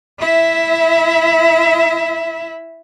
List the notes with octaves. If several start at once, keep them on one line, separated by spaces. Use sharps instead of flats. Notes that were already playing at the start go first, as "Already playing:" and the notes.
E4 E5